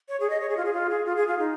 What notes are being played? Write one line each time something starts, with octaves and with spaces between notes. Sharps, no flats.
C#5
G#4
D#5
C#5
G#4
F4
G#4
F4
G#4
F4
G#4
F4
D#4